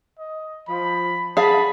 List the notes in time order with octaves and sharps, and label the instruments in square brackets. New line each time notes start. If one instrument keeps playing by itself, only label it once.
[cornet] D#5
[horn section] F3 [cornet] B5
[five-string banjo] G#4 F5 [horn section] F#5 B5 [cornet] A5